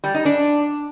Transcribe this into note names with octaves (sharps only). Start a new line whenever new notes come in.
G3
D#4
D4